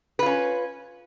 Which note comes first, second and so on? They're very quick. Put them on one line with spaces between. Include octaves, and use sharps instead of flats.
B4 F4 C#4